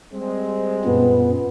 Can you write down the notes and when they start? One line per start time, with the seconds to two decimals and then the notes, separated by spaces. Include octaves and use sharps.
0.13 G3 G#3 C4
0.85 F#2 A#2 B3